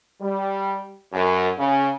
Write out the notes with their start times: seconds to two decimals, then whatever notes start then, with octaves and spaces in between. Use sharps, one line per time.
0.21 G3
1.12 F#2
1.58 C#3